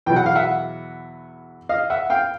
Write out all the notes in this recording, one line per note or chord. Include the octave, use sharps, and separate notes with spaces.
E2 B2 F#3 G5
F#5
F5
E5 F#5
D#5 F5
E5 F#5
F5 G5